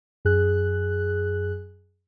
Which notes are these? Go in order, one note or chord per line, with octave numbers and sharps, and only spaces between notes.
F#2 G#4 F#6